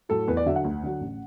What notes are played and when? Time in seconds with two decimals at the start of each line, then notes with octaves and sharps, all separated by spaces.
0.09 A2 F#3 A4
0.28 E2 B4
0.37 D5
0.46 D3 F#3 E5
0.56 F#5
0.64 D2
0.83 D3 F#3
1.01 A1